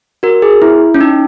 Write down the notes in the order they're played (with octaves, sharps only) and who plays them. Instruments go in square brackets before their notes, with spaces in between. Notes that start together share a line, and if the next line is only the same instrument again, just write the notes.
[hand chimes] F#4 A#4
G#4
E4
C#4
D#4